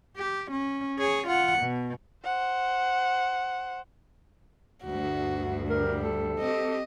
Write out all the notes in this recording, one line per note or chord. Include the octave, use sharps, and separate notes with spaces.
G4
C#4
G#4 C#5
F4 F#5
B2
C5 F#5
D2 G2 F#4
G3 A#4
A4
C4 G4 D#5